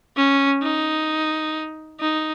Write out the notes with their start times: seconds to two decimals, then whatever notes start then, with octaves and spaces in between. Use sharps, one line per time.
0.16 C#4
0.62 D#4
2.00 D#4